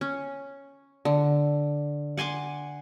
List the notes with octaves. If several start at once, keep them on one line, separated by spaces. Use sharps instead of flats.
C#4
D3
F#5 G#5 C6 D6